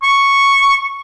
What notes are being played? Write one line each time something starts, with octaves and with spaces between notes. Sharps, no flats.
C#6